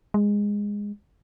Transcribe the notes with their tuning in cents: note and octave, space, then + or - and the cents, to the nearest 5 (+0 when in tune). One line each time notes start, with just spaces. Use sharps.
G#3 -15